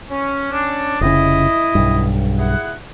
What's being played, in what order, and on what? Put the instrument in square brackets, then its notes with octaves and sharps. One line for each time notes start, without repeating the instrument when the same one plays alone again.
[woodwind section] C#4
C#4 D4
[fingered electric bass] F1 C#3 [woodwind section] E4 D#5
[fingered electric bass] B1 G2
[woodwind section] E4 G#4 F#5